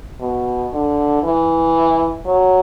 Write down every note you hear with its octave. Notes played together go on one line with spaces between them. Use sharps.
B2
D3
E3
F#3